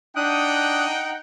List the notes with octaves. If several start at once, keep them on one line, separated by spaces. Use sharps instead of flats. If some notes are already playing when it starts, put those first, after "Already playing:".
D4 D#4 F#5 G5 D#6 F#6